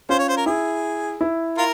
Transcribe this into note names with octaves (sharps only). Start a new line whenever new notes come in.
C#4 F4 C5
C#5
C5
A#4
E4 G#4
E4
F4 A#4